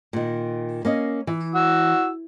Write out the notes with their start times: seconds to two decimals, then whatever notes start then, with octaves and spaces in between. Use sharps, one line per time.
0.13 A#2 D#3
0.85 A#3 C#4 D#5
1.27 E3
1.55 F#4 E6